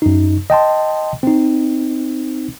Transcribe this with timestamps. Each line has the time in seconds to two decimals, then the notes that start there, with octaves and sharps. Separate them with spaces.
0.02 F#2 D#4
0.50 D#5 G5 A5 C6
1.23 C4 D#4